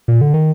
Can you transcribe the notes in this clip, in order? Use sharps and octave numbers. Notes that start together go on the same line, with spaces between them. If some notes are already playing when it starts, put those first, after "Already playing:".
A#2
D3
D#3